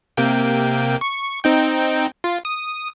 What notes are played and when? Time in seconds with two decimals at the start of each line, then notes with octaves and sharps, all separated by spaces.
0.17 C3 A#3 G5
1.01 C#6
1.44 C4 D#4 G5
2.24 F4
2.45 D#6